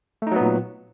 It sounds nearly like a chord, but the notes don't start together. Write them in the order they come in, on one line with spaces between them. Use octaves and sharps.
A3 D#4 F#3 B3 A#2